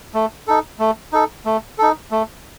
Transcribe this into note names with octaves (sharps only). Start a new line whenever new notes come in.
A3
D#4 A4
A3
D#4 A4
A3
D#4 A4
A3